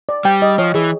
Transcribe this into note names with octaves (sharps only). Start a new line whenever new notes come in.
D5
G3 G5
D#5
F3 C#5
E3 G#4